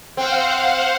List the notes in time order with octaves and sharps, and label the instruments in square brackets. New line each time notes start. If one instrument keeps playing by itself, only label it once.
[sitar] C4 [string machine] C5 F5 F#5